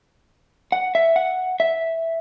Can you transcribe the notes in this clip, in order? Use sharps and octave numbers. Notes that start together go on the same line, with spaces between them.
F#5
E5
F#5
E5